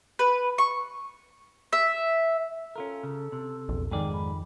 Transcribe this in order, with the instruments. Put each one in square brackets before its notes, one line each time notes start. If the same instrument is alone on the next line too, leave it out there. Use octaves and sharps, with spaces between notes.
[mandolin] B4
C#6
E5
[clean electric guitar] C#4 F4 A#4 [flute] A4
[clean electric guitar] C#3
C3
[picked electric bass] A#1 E2
[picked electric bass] F2 D#3 [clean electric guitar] G#2 G#4 D5 [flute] G5
[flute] B5